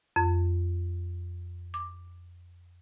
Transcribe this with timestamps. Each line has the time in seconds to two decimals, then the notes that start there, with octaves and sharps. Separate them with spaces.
0.16 F2
1.74 D6